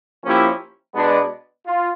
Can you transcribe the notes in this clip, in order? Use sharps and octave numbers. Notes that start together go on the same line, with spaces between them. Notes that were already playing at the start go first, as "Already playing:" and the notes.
F3 A#3 C#4 E4 G4
B2 G#3 B3 D4
F4